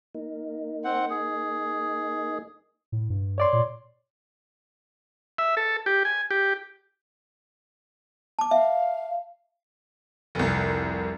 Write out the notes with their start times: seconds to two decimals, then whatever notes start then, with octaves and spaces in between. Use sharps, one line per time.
0.15 A#3 D#4
0.84 C4 F#5
1.10 G#4
2.92 A2
3.10 G2
3.38 C#5 D5 C6
3.53 A#2
5.38 E5
5.57 A4
5.86 G4
6.05 G#5
6.31 G4
8.39 A5 D6
8.51 E5 F5
10.35 F1 C2